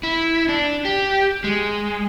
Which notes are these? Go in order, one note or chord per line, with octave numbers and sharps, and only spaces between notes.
E4
D4
G4
G#3